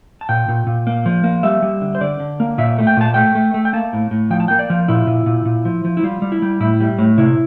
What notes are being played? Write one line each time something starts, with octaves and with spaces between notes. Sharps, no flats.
A5
A#2 G5
A#2
A#2
A#3
F3
A#3
G3 E5
G3
D3
C5
D3 D5
D3
A#3
A#2 E5
A3
G5
A#2 A5
A3 G5
A3
A3
G5
A#3 A5
A2
A2
F3 G5
A5
A#3 G5
D5
F3
A#2 E4
A#2
A#2
A#2
F3
F3
E4
G3 F4
G3
E4
G3
A2 E4
G3
A2
C3 E4